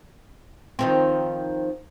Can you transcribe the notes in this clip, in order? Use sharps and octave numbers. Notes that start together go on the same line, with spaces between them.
D#3 F3 C4